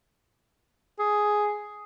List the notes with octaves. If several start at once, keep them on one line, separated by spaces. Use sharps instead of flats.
G#4